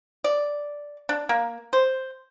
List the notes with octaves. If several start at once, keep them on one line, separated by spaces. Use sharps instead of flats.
D5
D4
A#3
C5